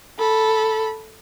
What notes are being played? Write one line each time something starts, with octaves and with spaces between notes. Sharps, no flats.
A4 B5